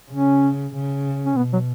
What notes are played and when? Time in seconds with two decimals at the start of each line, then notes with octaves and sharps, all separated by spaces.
0.11 C#3 C#4
0.74 C#3
1.25 C#4
1.37 B2 B3
1.53 F#3